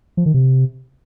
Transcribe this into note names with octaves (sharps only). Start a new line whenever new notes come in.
F3
D#3
C3